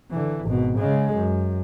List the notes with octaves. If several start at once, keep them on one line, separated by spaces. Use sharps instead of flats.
D3 E3
G#1 B2
C#3 G#3
F#2